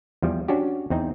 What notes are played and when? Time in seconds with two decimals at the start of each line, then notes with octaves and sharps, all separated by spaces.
0.22 E2 F3 G3
0.48 C#4 D4 F#4 G4
0.90 E2 C4 D#4